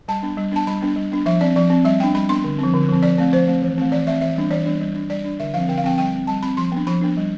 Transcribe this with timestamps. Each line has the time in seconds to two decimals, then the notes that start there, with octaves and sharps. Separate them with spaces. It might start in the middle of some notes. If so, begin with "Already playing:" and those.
0.08 G3 A5
0.22 B3 D4
0.37 G3
0.52 B3 D4 A5
0.67 G3 B5
0.82 B3 D4
0.96 G3
1.12 B3 D4
1.26 F3 E5
1.41 C4 D5
1.56 F3 D5
1.70 C4
1.85 G3 E5
2.00 B3 D4 G5
2.14 G3 B5
2.29 B3 D4 C6
2.44 D3
2.59 F3 C4
2.74 D3
2.89 F3 C4
3.03 F3 D5
3.18 A3 C4
3.32 F3 C5
3.48 A3 C4
3.62 E3
3.78 A3 C4
3.91 E3 D5
4.07 A3 C4 E5
4.21 E3 E5
4.36 G3 B3 D4
4.50 E3 D5
4.65 G3 B3 D4
4.81 G3
4.95 D4
5.10 G3 D5
5.25 D4
5.40 D3 E5
5.54 F3 C4 F5
5.69 D3 G5
5.78 F5
5.84 F3 C4 G5
5.98 G3 G5
6.13 C4
6.27 G3 A5
6.43 C4 B5
6.57 F3 C6
6.72 B3 D4
6.87 F3 B5
7.01 B3 D4
7.17 G3